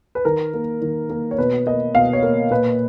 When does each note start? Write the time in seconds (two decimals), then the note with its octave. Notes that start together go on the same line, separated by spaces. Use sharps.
0.15 B4
0.25 D#3 A#4
0.54 A#3
0.82 D#3
1.10 A#3
1.31 C#5
1.38 B2 B4
1.66 A#3 D#5
1.95 B2 F5
2.13 C#5
2.23 A#3
2.51 A#2 B4